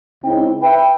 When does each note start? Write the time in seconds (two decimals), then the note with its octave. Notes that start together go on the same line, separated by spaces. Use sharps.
0.23 C#2 C#3 C4 D#4 E4 G5
0.62 B4 E5 G5